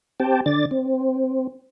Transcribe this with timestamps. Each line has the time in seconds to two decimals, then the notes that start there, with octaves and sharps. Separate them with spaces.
0.20 C4 G4 G5 A5
0.46 D3 D5 A6
0.71 C4